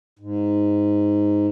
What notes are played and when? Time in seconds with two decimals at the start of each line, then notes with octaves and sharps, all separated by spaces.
0.19 G#2